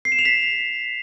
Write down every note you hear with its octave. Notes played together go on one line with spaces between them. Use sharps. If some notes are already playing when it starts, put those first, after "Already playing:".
C7
E7
F7
B6